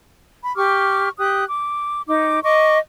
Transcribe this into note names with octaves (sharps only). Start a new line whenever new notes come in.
B5
G4 C#6 D6 F6
G4 D#6 F#6
D6
D#4 D6
D#5 C#6 D6